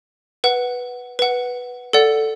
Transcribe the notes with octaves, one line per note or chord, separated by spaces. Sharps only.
B4 F#5
B4 F#5
A4 D5 F#5